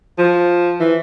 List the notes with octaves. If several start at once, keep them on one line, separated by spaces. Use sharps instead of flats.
F3
E3